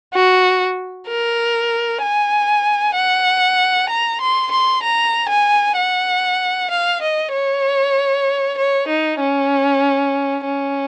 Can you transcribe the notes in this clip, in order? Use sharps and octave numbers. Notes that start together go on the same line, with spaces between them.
F#4
A#4
G#5
F#5
A#5
C6
C6
A#5
G#5
F#5
F5
D#5
C#5
C#5
D#4
C#4
C#4